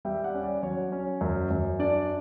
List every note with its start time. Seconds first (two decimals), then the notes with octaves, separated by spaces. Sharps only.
0.05 G3 E5 G5
0.24 D5 F#5
0.34 C#4
0.43 D5
0.63 F#3 C#5
0.92 C#4
1.21 F#2
1.51 F#2
1.79 D4 D5